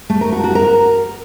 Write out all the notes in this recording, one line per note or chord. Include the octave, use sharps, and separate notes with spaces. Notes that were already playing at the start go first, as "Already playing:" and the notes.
A3
A#4
F#4
F#4
A#4